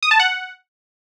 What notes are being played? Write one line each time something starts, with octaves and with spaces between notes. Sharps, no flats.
D#6
A5
F#5